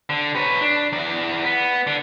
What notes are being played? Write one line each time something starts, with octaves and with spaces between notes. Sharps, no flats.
D3
B4 C#5
D4
E2 D5
B3
D3